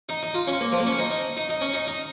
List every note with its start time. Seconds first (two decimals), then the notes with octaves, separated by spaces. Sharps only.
0.09 D#4
0.23 D#4
0.34 F4
0.47 C#4
0.61 A#3
0.72 F3
0.80 A#3
0.86 C#4
0.99 D#4
1.10 D#4
1.37 D#4
1.49 D#4
1.61 C#4
1.74 D#4
1.87 D#4